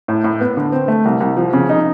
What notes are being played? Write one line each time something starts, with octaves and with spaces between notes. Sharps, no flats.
A2
A2
B3
D3
C4
A3
C2
C2
F3
C#3
D#4